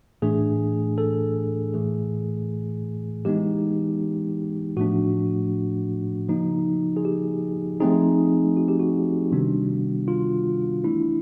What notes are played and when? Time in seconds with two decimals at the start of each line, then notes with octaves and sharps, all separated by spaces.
0.22 A2 E3 A3 D4 G#4
0.98 A4
1.74 A2 E3 A3 G#4
3.25 E3 G#3 B3 D#4 G4
4.77 A2 F3 A3 D4 F#4
6.29 C#3 F3 A#3 D#4
6.97 G#4
7.05 G4
7.80 F3 A3 C4 D#4 G#4
8.57 F#4
8.68 G4
8.80 F#4
9.32 C3 D#3 G3 B3 D4
10.08 F4
10.84 E3 A3 D4 E4